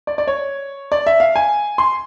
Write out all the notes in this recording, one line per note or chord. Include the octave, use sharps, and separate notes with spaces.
D5
D5
C#5
D5
E5
F5
G#5
C6